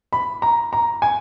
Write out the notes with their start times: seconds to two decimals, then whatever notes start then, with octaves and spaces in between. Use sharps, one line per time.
0.13 B5
0.42 A#5
0.73 A#5
1.02 G#5